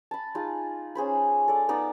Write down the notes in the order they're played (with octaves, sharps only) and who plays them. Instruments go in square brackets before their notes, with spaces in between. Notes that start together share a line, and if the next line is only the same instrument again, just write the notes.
[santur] A5 B5
D#4 F4 G#4
C#4 G#4 C5 B5
A4 D5
B3 D#4 D5